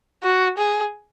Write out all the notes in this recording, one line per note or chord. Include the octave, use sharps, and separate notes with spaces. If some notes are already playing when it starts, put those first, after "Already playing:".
F#4
G#4